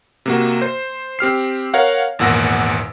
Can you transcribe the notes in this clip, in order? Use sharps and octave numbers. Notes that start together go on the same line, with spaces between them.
C3 A#3 F#4
C5
C4 G4 F6 C7
A#4 C#5 F5 F#5
G#1 E2 A#2 F#5 E6 A#6